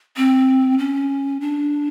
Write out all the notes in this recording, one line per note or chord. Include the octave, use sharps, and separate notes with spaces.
C4
C#4
D4